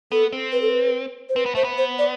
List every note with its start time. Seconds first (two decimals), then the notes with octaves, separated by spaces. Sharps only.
0.12 B3 A4
0.32 C4
0.52 B4
0.62 A4
0.69 B4
1.29 C5
1.36 C4 B4
1.46 B3
1.55 A3 C5
1.64 B3
1.77 C5
1.99 D5